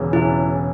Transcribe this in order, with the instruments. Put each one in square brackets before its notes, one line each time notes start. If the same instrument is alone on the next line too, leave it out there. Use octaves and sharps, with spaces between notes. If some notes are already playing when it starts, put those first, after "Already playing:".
Already playing: [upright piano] E1 E2 C#3 E3 C#4
[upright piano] E1 C#3 E3 C#4 [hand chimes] E4